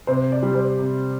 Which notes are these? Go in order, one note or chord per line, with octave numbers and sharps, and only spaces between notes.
C3 C5
D5
G3
C5
C3